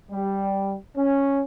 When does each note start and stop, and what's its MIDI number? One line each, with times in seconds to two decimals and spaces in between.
0.11 0.74 55
0.97 1.41 61